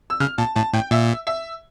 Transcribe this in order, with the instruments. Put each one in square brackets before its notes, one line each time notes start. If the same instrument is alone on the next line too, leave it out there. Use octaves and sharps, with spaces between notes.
[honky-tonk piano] E6
[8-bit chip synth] C#3 [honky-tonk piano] F6
[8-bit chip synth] A#2 [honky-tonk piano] A5
[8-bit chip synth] A2 [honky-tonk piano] A5
[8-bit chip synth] A2 [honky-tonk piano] G5
[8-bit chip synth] A#2 [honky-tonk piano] E5
[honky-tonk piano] E5